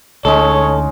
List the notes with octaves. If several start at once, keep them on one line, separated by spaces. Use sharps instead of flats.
D2 G#3 C#4 D#4 A4 C#5